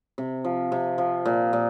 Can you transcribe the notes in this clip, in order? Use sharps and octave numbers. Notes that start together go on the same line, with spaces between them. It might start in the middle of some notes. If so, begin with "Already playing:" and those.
C3
F3
C3
F3
A#2
A#2